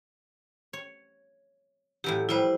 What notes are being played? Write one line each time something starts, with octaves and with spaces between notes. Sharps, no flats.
C#5
A2 E3 F#3 G4
F3 G3 E4 B4 C5